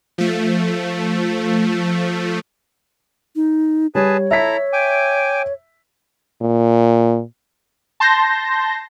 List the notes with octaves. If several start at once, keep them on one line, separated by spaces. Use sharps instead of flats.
F3 A3
D#4
G3 G#4 B4 C#5 A5
E4 A4 E5 A#5 B6
G5 G#5 D6
A#2
A5 C6 G6 A#6